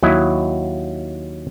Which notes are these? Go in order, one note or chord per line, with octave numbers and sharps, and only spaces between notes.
D#2 F#3 E4 D#5